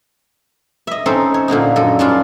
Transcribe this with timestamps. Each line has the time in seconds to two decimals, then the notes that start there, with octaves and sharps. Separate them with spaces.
0.87 D#5 E5
1.06 C4 C#4 D#4 A4 C5
1.34 C#5
1.48 A#2 D3 A#3 D#4
1.76 F#2 A4
1.99 G2 C#4 D4 F4